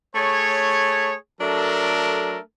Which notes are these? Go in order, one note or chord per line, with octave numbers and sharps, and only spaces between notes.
A3 G#4 C#5
F#3 A3 D4 A4 A#4